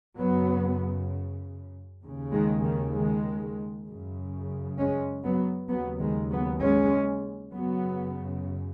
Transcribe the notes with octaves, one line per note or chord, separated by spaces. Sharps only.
F#2 C#3 F#3 B3
D#2 C#3
D#3 G#3
D#3
D#3 G#3
F#2 C#3
G#3 C#4
F#3 B3
D#2 C#3 F#3 B3
D#3 G#3
F#3 B3
G#3 C#4
F#2 C#3 F#3 B3